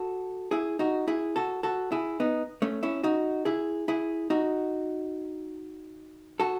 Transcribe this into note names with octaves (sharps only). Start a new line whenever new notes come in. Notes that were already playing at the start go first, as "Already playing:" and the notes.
Already playing: F#4 A4
E4 G#4
D#4 F#4
E4 G#4
F#4 A4
F#4 A4
E4 G#4
B3 D#4
A3 C#4
C#4 E4
D#4 F#4
E4 G#4
E4 G#4
D#4 F#4
F#4 A4